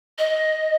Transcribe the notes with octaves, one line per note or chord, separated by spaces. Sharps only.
D#5